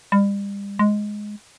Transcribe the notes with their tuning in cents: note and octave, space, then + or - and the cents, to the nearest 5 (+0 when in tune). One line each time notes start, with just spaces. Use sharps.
G3 +35
G#3 +5